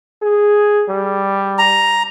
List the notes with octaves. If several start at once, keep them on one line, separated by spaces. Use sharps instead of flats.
G#4
G3
A#5